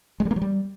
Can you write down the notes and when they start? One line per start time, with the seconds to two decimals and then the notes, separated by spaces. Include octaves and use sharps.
0.20 G#3
0.25 G3
0.31 A#3
0.36 F#3
0.42 G3